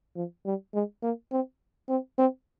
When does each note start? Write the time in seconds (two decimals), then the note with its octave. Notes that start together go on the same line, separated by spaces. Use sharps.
0.16 F3
0.45 G3
0.74 G#3
1.03 A#3
1.32 C4
1.89 C4
2.18 C4